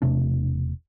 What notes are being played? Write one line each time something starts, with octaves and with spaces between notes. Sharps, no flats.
E1 C3 A3 D4